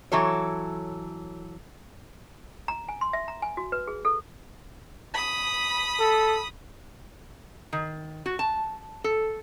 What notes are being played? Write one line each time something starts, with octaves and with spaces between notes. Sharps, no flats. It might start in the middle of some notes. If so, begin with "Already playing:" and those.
E3 F#3 A4 C#5
A#5
G#5
C6
E5
A#5
G#5
F#4
B4
G#4
A4
B5 D#6
A4
D#3
F#4
A5
A4